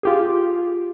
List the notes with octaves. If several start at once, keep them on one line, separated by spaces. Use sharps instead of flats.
F4 G4 G#4